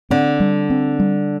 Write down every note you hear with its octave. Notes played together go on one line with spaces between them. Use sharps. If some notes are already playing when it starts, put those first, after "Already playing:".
D3 C4
G3
C4
G3